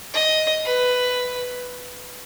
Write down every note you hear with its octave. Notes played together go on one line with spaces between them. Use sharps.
D#5
B4